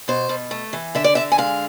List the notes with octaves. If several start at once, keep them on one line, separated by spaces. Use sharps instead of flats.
B2 C5
B2
A3
E3
D3 E5
D5
D3 E5
G#5
G#3 F5